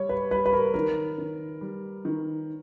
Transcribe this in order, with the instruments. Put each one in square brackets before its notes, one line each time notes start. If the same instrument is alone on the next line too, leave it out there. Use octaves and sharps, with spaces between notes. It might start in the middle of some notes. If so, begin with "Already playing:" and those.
Already playing: [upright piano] G3 [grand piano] C#5
[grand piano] B4
[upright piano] G3 [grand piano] B4
[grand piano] B4
A#4
[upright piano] D#3 [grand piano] A#4
[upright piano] D#3
G3
D#3